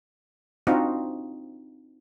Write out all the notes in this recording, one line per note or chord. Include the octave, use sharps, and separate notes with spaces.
C4 D4 D#4 F4 F#4